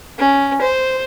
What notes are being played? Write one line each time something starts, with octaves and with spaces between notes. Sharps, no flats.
C#4
C5